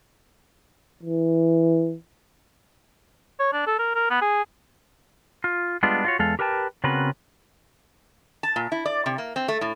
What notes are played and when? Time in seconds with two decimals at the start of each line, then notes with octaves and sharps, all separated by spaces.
1.03 E3
3.40 C#5
3.53 D4
3.67 A4
3.79 A#4
3.95 A#4
4.10 B3
4.22 G#4
5.44 F4
5.83 G3 G#3 B3 D4 F4
6.04 F4 F#4 C#5
6.19 E2 G#3 A4 F5
6.39 G4 A#4 B4 G5 A5
6.84 C#3 B3 C4 F#4 A#4 B4
8.43 A5
8.56 A#2
8.72 E4
8.86 D5
9.06 C3
9.18 A#3
9.36 C4
9.48 A3
9.61 A2